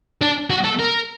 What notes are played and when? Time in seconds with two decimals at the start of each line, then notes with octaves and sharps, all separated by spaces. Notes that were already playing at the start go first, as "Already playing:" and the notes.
0.21 D4
0.50 F#4
0.64 A4
0.79 A#4